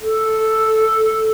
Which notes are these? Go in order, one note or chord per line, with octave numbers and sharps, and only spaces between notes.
A4